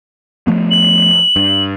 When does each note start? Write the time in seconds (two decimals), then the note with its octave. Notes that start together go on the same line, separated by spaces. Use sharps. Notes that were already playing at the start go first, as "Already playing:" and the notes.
0.47 F3 A3 B3
0.71 F#7
1.36 G2